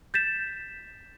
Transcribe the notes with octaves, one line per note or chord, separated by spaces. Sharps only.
G6 A6 B6 E7